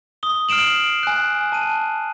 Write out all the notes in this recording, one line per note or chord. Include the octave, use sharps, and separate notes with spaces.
D#6 G7
F6 C7 D7 E7 F#7
G#5 F#6
A5 D#7